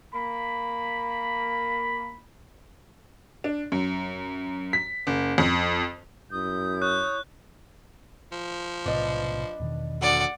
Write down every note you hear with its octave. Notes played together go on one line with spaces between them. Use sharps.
A#3 B5
D4
F#2
B6
F#1
F2
F#2 E4 D#6 G6
C#5 F#6
F3
B1 A2 C3 D4 B4 D#5
E2 B2 D#3
D2 D5 F#5